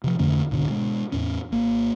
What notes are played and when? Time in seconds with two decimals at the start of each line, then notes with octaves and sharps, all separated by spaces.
0.04 C3 F3
0.19 F2 D3 A3 C#4
0.51 C#2 G#2 B2 D3
0.68 B2 G#3
1.12 E2 A2 C#4
1.52 G#1 A#3